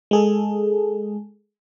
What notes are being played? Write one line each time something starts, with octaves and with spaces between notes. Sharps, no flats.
G#3 G#4 A4